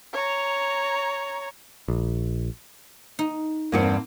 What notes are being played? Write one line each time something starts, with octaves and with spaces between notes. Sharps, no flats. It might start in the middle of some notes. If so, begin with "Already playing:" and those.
C#5 A#5
A#1
D#4
E2 G2 A#3 C4 F#5